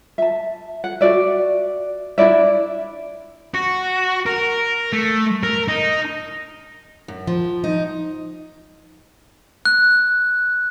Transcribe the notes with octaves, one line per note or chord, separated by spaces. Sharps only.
E5 A5
F#5
F#4 D5 E5
D4 E4 D5 E5
F#4
A#4
A3
A#4
D#4
F#2
F3
D#4
F#6